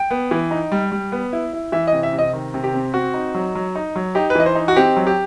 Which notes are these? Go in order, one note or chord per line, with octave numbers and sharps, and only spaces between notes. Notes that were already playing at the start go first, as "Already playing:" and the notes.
Already playing: G5
B3
E3
D#4
G3
G3
B3
E4
E4
E3 E5
D#5
C3
E5
C3
D#5
D#3
C3
G4
C4
C4 F#4
D#4
F#3
F#3
D#4
F#3
D#4 G4
B4
E3 D#5
C5
D#4
F#4
C4 G4
F#3
G4